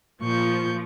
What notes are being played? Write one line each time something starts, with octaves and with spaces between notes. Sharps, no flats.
A#2 F3 C#6 G6